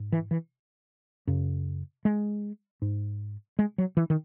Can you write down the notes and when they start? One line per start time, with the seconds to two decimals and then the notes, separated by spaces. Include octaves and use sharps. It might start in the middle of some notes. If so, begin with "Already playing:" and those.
Already playing: G#2
0.12 E3
0.31 E3
1.27 F#2 C#3
2.05 G#3
2.82 G#2
3.59 G#3
3.78 F#3
3.97 E3
4.10 D#3